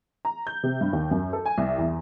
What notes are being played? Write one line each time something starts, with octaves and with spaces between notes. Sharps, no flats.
A#5
G6
C3
G2
D#2
F#2
A4
G#5
C2
E2